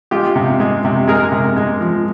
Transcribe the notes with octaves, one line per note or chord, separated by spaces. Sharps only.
G#3 F4 G4
C3
G#3
C3
G#3 G#4 A#4
C3
G#3
F3